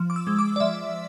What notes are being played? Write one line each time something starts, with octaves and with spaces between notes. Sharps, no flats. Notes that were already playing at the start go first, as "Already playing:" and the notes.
Already playing: F3
D6
E6
G#3
D6
D5
F3 E5